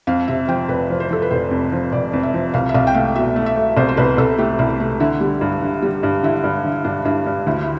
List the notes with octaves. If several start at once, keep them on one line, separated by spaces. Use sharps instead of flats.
F2 F5
C3 E5
F3 G5
F1 B4
F3
C5
F3 A4
B4
F1 C5
F2
F3
F1 D5
F2
E5
F3
C2 F5
E5
C2 F5
G5
A3 F5
B2 E5
A3
E5
A3
C2 C5
C5
C2 B4
C2 A4
A3 G4
C2 E4
A3
D3 E4
G3
G2
D3
G3
G2
D3 E4
G2
D3
G2 D4
G2 E4
G2
D2 E4
E4